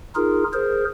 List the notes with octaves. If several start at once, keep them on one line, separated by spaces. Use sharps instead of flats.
D#4 F4 G#4 A#4
G#4 A#4 C5